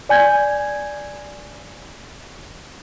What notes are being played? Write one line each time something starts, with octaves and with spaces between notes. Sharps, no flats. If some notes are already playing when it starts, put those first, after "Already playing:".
D5 G#5 G6 G#6